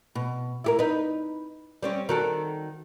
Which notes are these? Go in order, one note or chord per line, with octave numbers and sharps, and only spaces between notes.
B2
E4 G4 A#4
D#4 B4
G3 C4 C#4
D#3 F#4 A4